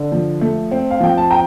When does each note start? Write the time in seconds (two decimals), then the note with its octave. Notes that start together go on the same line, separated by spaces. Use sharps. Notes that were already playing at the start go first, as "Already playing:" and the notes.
Already playing: D3
0.12 F3
0.41 A3
0.71 C4
0.91 F5
1.00 F3 G5
1.17 A5
1.30 G5 A#5